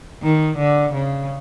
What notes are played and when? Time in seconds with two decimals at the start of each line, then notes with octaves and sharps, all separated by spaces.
0.22 D#3
0.58 D3
0.94 C#3